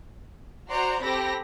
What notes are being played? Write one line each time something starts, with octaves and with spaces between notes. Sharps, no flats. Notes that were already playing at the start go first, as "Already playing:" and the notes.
F#4 C5 D5 A#5 C6
C4 G4 A4 B5 A#6